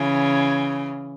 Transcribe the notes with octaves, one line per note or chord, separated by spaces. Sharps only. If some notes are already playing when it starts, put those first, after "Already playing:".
Already playing: C#3 E3